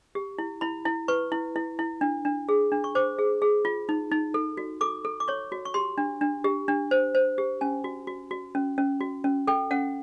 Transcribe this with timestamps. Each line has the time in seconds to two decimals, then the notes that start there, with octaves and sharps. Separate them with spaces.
0.15 G4
0.38 E4
0.61 E4 B5
0.85 E4
1.08 B4 C#6
1.32 E4
1.56 E4
1.79 E4
2.01 D4
2.25 D4
2.49 G#4
2.72 D4
2.84 C#6
2.95 C5 D6
3.19 G#4
3.42 G#4
3.65 F4
3.89 D#4
4.11 D#4
4.34 A4
4.57 F#4
4.81 A4 D6
5.05 A4
5.20 D6
5.28 C#5 C#6
5.52 F#4
5.65 C#6
5.74 G4 C6
5.98 D4
6.21 D4
6.44 G4
6.68 D4
6.91 C5
7.15 C5
7.38 G4
7.61 C#4 G#5
7.84 F#4
8.07 F#4
8.31 F#4
8.55 C#4
8.78 C#4
9.00 F#4
9.24 C#4
9.47 A4 G5
9.71 C#4 F#5